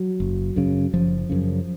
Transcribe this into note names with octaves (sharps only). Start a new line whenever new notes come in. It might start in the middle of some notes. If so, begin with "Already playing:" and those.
Already playing: F#3
F#1
F#2 C#3
F#1 F3
F#2 C#3